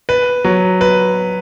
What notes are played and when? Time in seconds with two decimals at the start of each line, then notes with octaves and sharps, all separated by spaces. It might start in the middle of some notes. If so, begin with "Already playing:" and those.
0.09 B4
0.44 F#3
0.81 B4